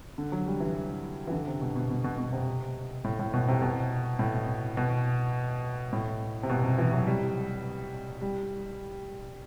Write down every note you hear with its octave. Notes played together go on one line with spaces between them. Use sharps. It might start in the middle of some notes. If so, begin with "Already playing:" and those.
D3
F#3
G3
E3
E3
D3
C3
B2
B2
B2
B2
B2
C3
A2
A2
B2
C3
B2
A2
B2
A2
C3
B2
C3
E3
F#3
G3
G3